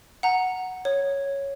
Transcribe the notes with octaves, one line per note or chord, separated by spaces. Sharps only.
F#5 A#5
C#5